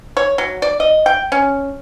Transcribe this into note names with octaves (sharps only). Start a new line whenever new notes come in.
C#5
F#3
D5
D#5
G5
C#4